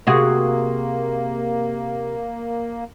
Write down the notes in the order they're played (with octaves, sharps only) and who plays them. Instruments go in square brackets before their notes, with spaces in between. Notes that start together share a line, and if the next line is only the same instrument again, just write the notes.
[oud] C3 F#4 G#4 [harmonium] A#3